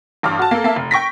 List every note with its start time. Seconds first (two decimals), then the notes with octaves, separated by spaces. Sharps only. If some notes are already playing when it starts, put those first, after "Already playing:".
0.23 A1 G2 D6 F6
0.39 F#4 A5
0.51 A#3 A4
0.64 A#3 E5 A5
0.76 F1
0.91 G5 C#6 A#6 B6